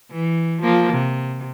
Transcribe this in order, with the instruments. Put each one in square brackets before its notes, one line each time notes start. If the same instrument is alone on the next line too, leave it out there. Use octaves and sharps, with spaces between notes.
[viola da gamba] E3
F3 A#3
C3